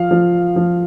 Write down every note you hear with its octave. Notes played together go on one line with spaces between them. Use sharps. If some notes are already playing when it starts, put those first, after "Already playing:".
Already playing: F3 F5
F3
F3